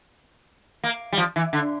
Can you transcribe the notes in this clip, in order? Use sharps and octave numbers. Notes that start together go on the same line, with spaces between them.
A#3
G3
F3
E3
D3